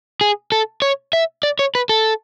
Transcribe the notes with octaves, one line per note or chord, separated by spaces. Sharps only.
G#4
A4
C#5
E5
D5
C#5
B4
A4